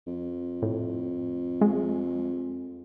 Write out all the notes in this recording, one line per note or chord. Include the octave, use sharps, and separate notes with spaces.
F2
A2
G#3